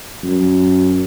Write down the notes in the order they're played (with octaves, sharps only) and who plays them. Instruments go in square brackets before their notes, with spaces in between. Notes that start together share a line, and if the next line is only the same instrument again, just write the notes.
[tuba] F#2